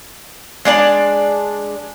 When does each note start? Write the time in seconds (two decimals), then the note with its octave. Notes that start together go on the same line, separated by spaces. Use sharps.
0.65 G#3 D4 D5 A5